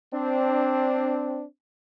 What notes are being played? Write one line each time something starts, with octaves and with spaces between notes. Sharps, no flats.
C4 D4